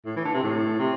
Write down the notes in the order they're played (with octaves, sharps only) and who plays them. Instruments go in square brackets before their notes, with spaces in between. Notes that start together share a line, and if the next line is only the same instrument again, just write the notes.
[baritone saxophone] A2
E3
D3
C3
A2
C3